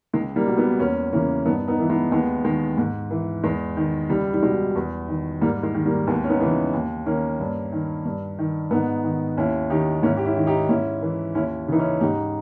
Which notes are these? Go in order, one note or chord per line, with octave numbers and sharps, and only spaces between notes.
C#2 G#3
G3 A#3
B2
G#3 B3
E2 A#3 C#4
C#3 E3 A#3 C#4
G2 B3 D#4
B3 D#4
E3
G#3 B3
D#2 G#3 B3
D#3 G#3
G#2
E3
E2 G#3
D#3
C#2 G3
G3
B2 G#3
E2
D#3
G#2 G3 A#3
G#3
D#3
G3 A#3
D#2 G#3 B3
C#4
B3 D#4
C#3 E3
D#2
D#3 A#3 C#4
G2
D#3
G2
D#3
G#2 B3 D#4
D#3
D#2 C#4 E4
D#3 D#4 G4
G#2 C#4 E4
G4
C#4 E4
D#3
D#4 G4
G#2 C#4 E4
E3
D#2 C#4 E4
C#3 E3 D#4
C#4 E4
G#2 D#4 G4